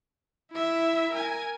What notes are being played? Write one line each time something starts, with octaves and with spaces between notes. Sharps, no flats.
E4 E5
A#4 G#5